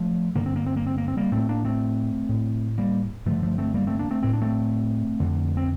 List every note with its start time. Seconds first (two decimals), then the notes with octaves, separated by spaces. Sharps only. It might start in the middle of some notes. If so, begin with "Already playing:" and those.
Already playing: F3 A3
0.36 G2 D3 A#3
0.46 C4
0.56 A#3
0.66 C4
0.76 A#3
0.87 C4
0.98 A#3
1.08 C4
1.17 G3 A#3
1.32 A2 A3 C4
1.49 A#3 D4
1.65 A3 C4
2.29 A2
2.78 G3 A#3
3.26 G2 D3 F3 A3
3.43 F3 A3
3.58 A3 C4
3.74 G3 A#3
3.87 A3 C4
3.99 A#3 D4
4.11 A3 C4
4.23 A2 C4
4.33 D4
4.42 A3 C4
5.20 F2 D3
5.57 C4